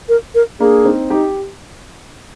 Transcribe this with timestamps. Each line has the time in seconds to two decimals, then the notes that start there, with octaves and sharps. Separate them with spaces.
0.09 A#4
0.35 A#4
0.60 A#3 D4 G#4
0.84 C4 D#4
1.10 D#4 G4